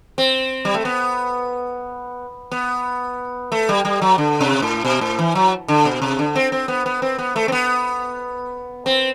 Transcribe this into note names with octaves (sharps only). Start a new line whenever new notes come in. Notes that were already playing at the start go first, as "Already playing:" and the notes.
C4
G3
A3
B3
B3
A3
G3
G3
F#3
D3
C3
A2
B2
A2
E3
F#3
D3
B2
C3
D3
C4
C4
B3
B3
C4
B3
A3
C4
B3
C4